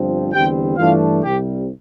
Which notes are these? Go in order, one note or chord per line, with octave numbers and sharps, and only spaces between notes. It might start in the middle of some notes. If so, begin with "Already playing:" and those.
Already playing: G1 G2 F3 C4
E2 D3 G3 C4 G4 G5
G2 E3 A3 D4 F4 F5
C2 C3 G3 G4 G5